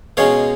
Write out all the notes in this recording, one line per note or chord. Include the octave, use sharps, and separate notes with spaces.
B2 G#3 C#4 C#5 F5